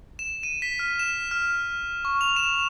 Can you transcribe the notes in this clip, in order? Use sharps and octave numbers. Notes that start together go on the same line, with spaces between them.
E7
D#7
B6
F6
E7
F6
C#6
F7
E7